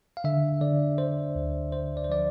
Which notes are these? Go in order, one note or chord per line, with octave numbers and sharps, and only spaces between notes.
F5
D3 E5
D3 D5
D3 C5
D2
D3 C5
D5
C5
F3 D5